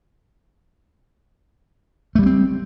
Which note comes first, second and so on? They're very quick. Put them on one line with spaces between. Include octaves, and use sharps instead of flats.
A3 G3 A#3 C4